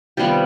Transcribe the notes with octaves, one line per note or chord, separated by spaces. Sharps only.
C3 D#3 G3 B3 F4 G4